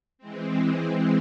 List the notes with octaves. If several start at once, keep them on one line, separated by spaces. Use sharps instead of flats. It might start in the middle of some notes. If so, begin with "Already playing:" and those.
E3 G#3 C4